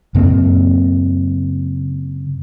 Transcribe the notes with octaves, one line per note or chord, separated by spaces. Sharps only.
F#2 C#3 A#3 C4